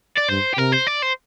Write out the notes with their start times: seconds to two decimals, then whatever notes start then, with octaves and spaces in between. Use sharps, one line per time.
0.18 D5
0.29 G2 C5
0.54 G4
0.58 C3 A#4
0.72 C5
0.87 D5
1.02 C5